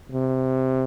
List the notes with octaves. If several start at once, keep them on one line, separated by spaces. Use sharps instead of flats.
C3